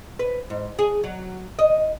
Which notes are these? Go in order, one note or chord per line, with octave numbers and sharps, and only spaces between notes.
B4
G#2
G#4
F#3
D#5